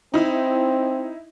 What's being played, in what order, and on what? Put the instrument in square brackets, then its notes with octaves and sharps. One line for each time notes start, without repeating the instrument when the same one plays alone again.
[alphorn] C4 [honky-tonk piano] D#4 E4